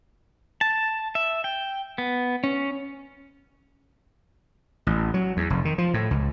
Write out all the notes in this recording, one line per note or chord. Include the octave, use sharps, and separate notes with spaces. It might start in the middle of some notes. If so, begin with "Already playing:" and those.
A5
E5
G5
B3
C#4
A1
F#3
E2
F1
D#3
F3
A2
C#2